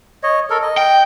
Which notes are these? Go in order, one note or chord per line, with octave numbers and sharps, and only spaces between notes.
C#5 D#5
A4 A#4
D#5
G5